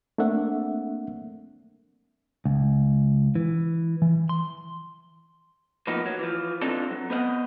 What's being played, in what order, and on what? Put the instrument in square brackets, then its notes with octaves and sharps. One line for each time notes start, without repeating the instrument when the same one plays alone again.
[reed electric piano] A3 A#3 C4 D4 E5 F#5
[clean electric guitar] C#2
E3
E3
C6
A2 F3 A#3 B3 D#4
F#3
E3 F3
C4 D4 D#4 F4 A4
F#3
B3 C5 D#5 F5 F#5